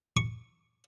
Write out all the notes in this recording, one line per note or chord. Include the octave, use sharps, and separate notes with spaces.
C#6